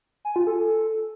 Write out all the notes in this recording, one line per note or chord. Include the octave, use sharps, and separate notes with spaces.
G#5
F4
A4